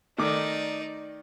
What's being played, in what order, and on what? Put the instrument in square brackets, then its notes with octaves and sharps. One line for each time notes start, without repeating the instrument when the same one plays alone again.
[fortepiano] D#3 A3 D6 [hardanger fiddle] D#4 D5